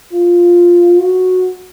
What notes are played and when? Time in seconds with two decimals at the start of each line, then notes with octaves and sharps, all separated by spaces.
0.12 F4
0.99 F#4